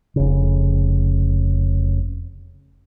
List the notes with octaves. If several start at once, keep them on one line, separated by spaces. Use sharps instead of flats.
F1 C#3